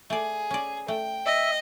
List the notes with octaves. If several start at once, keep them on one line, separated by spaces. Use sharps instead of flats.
A3 G#4 D5
C#4 D5
A3 G5
D#5 E5